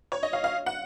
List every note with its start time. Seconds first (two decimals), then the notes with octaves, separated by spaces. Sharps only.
0.12 C#5
0.23 D#5
0.33 F5
0.44 F5
0.66 F#5